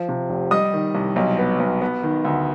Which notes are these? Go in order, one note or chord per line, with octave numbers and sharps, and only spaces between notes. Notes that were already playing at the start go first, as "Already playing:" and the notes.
Already playing: F3
C3
F1
G3 D#5 D#6
D#3
C2
B1
B3
B1
B3
D#3
D2